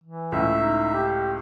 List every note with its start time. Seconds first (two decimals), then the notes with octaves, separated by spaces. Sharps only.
0.03 E3
0.32 C#2 A2 E5
0.59 D#4
0.94 G4